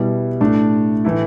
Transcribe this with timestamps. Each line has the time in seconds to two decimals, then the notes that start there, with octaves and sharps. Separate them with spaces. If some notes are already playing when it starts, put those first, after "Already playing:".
Already playing: B2 G3 E4
0.41 A2 A3 D4
1.05 A2 E3 A3 E4